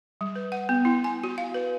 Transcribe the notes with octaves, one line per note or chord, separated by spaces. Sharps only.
G3
B4
F#5
B3
E4
G#5
F#4
F5
B4